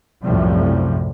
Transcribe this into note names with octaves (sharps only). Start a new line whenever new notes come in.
C2 F#2 A2 C3 F3 G3